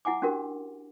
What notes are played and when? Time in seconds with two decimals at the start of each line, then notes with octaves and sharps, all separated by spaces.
0.05 E4 F#5 G#5 D6
0.22 C#4 D4 F#4 G4 A#4